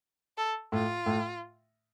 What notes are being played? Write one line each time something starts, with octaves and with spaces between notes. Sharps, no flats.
A4
A2 F4
A2